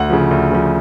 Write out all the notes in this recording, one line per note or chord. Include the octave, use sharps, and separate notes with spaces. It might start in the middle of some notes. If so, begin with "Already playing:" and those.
Already playing: D2 F#5
C#3 F3
D2
C#3 F3